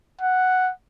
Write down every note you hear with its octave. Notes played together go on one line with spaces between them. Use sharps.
F#5